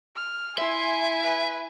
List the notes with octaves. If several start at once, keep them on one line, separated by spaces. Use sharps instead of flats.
F6
E4 E5 G#5 C6
B4